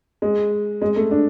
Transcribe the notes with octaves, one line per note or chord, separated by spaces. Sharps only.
G#3
G#3
A3
D4